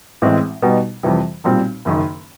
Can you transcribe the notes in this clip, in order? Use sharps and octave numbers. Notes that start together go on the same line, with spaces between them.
A1 A2 E3 G#3 C4
B2 G3 B3 D#4
F2 C3 E3 G3
B1 A#2 G3 C4
F#1 F#2 D#3